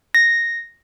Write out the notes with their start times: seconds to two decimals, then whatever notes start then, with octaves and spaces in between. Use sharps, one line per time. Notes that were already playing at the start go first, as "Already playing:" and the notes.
0.15 A#6